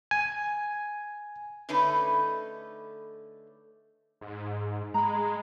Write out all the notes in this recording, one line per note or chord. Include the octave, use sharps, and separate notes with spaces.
G#5
D3 A3 C#4 D#4 B4
G#2
G#3 A#5 B5